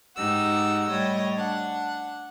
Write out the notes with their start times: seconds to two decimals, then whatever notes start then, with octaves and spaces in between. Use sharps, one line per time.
0.16 G#2 D#4 G4 F#5 E6
0.88 A2 G3 C#5 D#5
1.37 D4 F#5